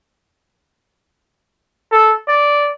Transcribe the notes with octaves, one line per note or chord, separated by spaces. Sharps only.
A4
D5